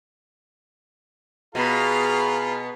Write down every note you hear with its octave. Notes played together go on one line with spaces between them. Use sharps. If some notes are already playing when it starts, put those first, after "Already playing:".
B2 B3 F4 G#4 F5 A#5